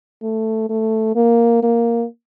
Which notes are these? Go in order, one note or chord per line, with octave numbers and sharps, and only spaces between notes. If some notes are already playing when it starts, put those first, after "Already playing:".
A3
A3
A#3
A#3